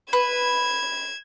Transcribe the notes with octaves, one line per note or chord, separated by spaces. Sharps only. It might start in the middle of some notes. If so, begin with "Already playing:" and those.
B4 G#6 E7